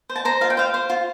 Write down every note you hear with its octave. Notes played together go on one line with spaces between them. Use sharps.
C5
A5
C5 A#5
F4 F5
G5
C5 F5
C5
F4